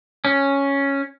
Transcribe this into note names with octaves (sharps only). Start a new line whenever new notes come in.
C#4